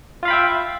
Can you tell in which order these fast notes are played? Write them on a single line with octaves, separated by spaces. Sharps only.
F4 F5 B5 G5 E5